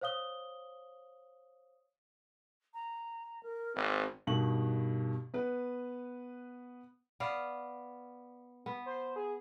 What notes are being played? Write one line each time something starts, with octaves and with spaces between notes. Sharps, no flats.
C5 C#5 F5 D#6 G7
A#5
A#4
G#1 C4
G2 B2 D#3 F#7
B3 B4
B3 D5 F5
B3
C5
G#4